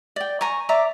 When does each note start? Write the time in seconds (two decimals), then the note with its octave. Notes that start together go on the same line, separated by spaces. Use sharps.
0.16 D5 G5
0.41 G#5 A#5 C#6
0.69 D5 E5 A#5 D6